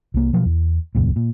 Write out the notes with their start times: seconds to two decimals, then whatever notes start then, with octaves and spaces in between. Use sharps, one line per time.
0.14 C2 A#3
0.33 B2 F3 F#3
0.45 E2
0.95 D#1 C#2 F#2 A#2
1.16 A#2